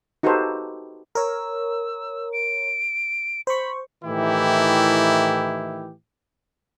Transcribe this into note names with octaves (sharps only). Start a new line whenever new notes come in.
D#4 F#4 G4 A4 B4 C5
A#4 C#5 E6
D7
C5 B5 C#6
A2 D#3 E3 E4 G4